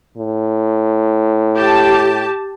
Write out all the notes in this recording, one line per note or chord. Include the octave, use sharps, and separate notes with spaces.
A2
G4 A5